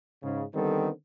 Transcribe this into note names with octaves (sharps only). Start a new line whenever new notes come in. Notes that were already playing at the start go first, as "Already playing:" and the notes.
G#2 C#3
D3 D#3 G3 B3 C4 A4